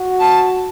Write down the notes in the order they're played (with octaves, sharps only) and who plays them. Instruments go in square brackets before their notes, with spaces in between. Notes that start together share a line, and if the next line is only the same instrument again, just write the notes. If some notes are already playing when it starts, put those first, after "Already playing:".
Already playing: [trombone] F#4
[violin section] A5